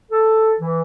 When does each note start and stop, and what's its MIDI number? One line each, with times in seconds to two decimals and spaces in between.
0.11 0.53 69
0.59 0.82 52